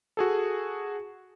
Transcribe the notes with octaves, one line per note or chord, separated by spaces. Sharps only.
F#4 G#4 A4